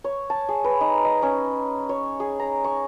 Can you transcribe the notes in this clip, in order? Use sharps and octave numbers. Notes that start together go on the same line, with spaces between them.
C#5
A5
G#4
B4
D#4
D#5
C#4
C#5
G#4
A#5
C#6